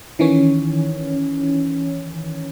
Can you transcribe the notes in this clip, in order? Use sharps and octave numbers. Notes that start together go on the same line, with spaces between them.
D#3 E3 C#4 C#5